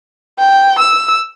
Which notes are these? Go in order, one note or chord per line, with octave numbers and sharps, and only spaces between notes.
G5
E6